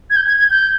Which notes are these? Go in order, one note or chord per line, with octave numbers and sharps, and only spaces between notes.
G#6
G6
G#6
G#6
G6